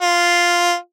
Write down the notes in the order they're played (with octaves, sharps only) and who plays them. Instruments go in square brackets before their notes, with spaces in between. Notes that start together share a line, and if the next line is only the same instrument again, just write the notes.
[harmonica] F4